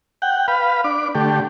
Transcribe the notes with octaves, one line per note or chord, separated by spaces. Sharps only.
F#5 G5
B4 F5 B5
D4 D6
D3 A3 G4